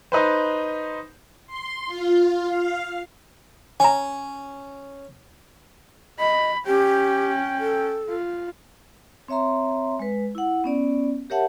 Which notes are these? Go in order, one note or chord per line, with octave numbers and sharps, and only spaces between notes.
D#4 B4 C5
C6
F4
F5
C#4 G#5 A#5
D#5 B5
C#4 G4 G5
A4
F4
C4 C#5 E5 A#5 C6
G#3 B4
E4 F#5
B3 C#4 D5
G4 A#4 C#5 E5 F#5 A5